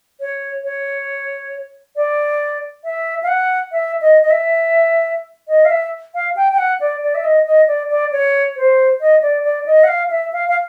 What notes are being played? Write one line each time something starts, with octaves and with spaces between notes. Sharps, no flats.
C#5
C#5
D5
E5
F5
F#5
E5
D#5
D#5
E5
D#5
F5
E5
F5
G5
G5
F#5
D5
D5
E5
D#5
D#5
D5
D5
C#5
C5
D#5
D5
D5
D#5
F#5
F5
E5
F5
F5